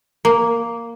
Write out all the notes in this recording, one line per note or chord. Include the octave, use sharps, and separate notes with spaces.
A#3